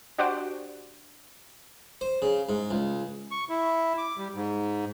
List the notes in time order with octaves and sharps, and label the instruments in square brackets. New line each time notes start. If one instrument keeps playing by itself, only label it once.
[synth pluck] D4 F#4 G4 C5 D5 D6
[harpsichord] C5
C#3
G#2
C#2
[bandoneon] C#6
E4
D6
G3
G#2